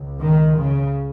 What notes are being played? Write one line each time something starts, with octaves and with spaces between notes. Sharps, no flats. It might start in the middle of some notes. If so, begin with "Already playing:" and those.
Already playing: C#2
D#3
C#3